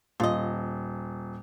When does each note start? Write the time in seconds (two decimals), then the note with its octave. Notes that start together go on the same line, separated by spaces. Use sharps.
0.20 D#1 F4 D#5